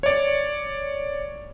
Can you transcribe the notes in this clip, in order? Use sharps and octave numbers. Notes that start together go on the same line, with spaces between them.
C#5 D5